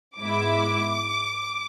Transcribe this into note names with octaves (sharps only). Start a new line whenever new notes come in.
G#2 G#3 B3 E4 D6